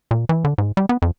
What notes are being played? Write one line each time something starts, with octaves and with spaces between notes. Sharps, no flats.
A#2
E3
D3
G#2
G3
B3
F2